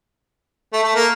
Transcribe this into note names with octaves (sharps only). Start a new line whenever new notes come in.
A3
A3
A#3